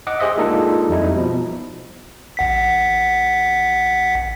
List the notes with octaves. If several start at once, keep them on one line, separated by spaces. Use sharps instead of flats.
D#5 F#5 D6
G4 G#4 C5 D#5 E5
G#3 A#3 D4 D#4 F4 A4
F2 G3 D#4 E4
B2 F3
A1 F#5 B6